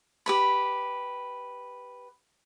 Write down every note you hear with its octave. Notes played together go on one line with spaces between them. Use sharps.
G4 B4 B5